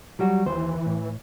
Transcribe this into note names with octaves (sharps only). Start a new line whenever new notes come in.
F#3 G3 F#4
D#2 E3 C5
A2